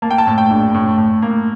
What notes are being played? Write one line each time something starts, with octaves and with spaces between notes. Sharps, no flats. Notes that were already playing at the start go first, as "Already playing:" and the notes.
A#3 A5
G5
A5
A2
G5
A#1
A2
A2
A#3